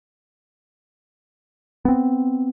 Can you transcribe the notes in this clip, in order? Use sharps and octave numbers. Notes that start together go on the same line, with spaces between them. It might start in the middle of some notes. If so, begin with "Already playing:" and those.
B3 C4